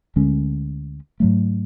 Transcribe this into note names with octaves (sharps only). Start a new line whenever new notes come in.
D2 D3 G#3 C#4
G#2 F#3 A3